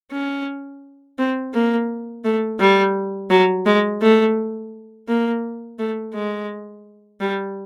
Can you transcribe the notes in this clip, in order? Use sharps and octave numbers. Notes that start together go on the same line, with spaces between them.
C#4
C4
A#3
A3
G3
F#3
G#3
A3
A#3
A3
G#3
G3